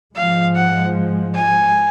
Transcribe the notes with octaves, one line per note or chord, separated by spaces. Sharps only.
G#2 F3 G#3 F5
F#5
G#5